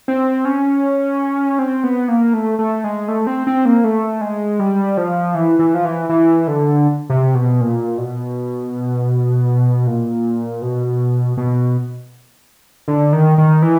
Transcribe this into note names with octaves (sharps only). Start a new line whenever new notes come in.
C4
C#4
C4
B3
A#3
A3
A3
G#3
A3
C4
C4
A#3
A3
G#3
G3
F3
E3
E3
F3
E3
E3
D3
C3
B2
A#2
B2
A#2
B2
B2
D3
D#3
D#3
E3